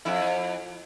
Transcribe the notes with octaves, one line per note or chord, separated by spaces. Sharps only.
F2 E4